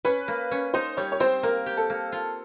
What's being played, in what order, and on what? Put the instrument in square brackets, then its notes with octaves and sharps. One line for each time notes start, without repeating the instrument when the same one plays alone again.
[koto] C#4 [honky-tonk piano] B4
[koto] A#3
C#4
[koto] D#4 [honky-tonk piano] C5
[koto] G3 [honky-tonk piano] C#5
[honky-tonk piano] C#5
[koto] C4 [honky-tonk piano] C5
[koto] A#3 [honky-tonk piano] A#4
[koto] G4
[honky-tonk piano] A4
[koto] A#3
F4